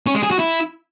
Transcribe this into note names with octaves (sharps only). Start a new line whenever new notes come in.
C#4
G#3
G#4
F#4
E4